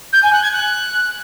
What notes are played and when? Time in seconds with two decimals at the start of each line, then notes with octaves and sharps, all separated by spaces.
0.13 G6
0.22 G#5
0.32 F#6
0.42 G#6
0.52 F#6